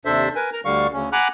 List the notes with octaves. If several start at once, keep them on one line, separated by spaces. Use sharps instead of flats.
D#2 C3 D4 A4 C5 E5
A#4 B4 G#5
A#4 A#5
D2 D3 G3 F5 C#6
D2 C#3 C#4
F#5 G#5 A#5 B5 D6 F#6